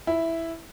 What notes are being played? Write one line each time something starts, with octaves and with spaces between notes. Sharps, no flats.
E4